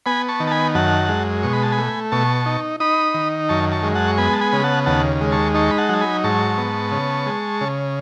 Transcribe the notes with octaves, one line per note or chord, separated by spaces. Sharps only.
B3 G#5 B5
A5 C#6
D#3
A5
G#5 B5
F#2 F#5 A5
G#3
B2 C#6
B5
A5
G#5 B5
A3
B2 A5 C#6
D#4
D#4 B5 D#6
D#3
F#2 A5 C#6
A5 C#6
G#3
F#5 A5
C#6
B3 G#5 B5
A5
G#5 B5
C#3 B5
F#5 A5
D#2 F#5 A5
G#3
A5 C#6
D#4 A5 C#6
B5
F#5 A5
F#3 A5
G#5 B5
G#2 A5 C#6
B3
C#3
G#3
C#3